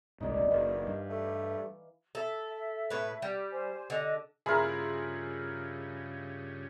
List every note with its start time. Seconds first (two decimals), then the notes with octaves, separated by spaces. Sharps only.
0.20 D#1 C2 G#2 D#4 D5
0.51 F#1 D#3 E3 F5
0.87 G2
1.10 A3
2.15 A4 E5
2.90 A2 B4
3.22 G3
3.51 C5 G#5
3.90 D3 D#5
4.46 G2 C#3 E4 F4 G#4 A#4